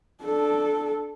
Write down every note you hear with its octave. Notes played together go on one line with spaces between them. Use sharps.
D4 A4